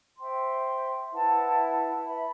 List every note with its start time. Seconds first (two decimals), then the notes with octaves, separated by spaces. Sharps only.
0.18 C5 E5 G5 C6
1.11 E4 B4 F#5 A5
2.05 B4 E5 B5